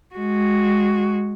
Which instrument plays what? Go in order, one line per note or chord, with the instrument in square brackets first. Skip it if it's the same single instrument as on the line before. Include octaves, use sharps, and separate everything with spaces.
[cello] G#3 F#4